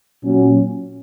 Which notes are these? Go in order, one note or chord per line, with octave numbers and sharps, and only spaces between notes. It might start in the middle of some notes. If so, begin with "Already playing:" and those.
A#2 F#3 C#4